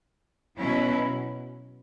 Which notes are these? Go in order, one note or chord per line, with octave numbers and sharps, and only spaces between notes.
B2 F#3 C#4 E4